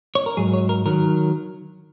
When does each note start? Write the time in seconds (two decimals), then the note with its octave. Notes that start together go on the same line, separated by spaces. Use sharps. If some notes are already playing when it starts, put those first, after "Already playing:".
0.15 C#5
0.26 A#4
0.37 G#2 F#3 G#4
0.53 C#5
0.69 A#4
0.86 D#3 F#3 A#4